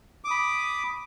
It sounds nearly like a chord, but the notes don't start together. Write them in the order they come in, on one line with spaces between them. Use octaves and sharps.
D6 D#6 B5